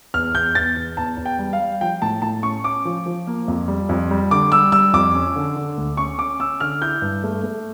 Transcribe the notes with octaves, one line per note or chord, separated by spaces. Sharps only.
E2 F6
E2 G6
E2 A6
E2
E2 A5
E2
G5
G3
F5
G3
F3 G5
A2 A5
A2 A5
C#4 C#6
C#4 D6
F3
F3
A#3
F2
G3
F2
G3
D3 D6
G3 E6
G3 E6
F2 D6
C#4
D3
D3
D2
C#4 C#6
C#4 D6
C#4 E6
D3 F6
E4 G6
G2
A3
A3